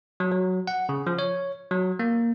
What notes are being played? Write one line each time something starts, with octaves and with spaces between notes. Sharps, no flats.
F#3
F#3
F#5
C#3
F3
C#5
F#3
A#3